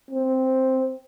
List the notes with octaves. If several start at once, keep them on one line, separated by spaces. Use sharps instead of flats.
C4